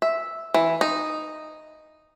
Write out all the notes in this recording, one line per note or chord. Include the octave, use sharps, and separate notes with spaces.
E5
E3
D#4